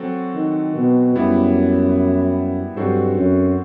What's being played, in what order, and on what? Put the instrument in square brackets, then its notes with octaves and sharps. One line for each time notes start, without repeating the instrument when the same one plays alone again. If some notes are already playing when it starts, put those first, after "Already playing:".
Already playing: [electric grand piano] F#3 C4 F#4 A4
[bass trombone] D#3
B2
[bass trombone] F#2 [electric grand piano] G3 B3 E4
[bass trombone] G2 [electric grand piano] F#3 C4 F#4 A4 C5
[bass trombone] F#2